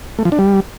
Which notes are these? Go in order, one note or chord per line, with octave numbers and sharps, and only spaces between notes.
A3
F3
D4
G3